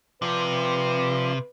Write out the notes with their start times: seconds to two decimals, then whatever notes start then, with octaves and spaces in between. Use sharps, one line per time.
0.22 C3 F3 B4 D5 C6